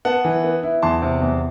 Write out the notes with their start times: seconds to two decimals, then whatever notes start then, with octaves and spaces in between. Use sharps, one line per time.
0.05 B3 F#5 A5
0.25 E3
0.44 B3
0.63 E4
0.82 E2 A5 C6
1.02 C3
1.22 E2